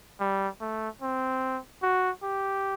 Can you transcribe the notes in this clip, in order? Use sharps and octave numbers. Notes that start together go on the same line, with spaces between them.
G3
A3
C4
F#4
G4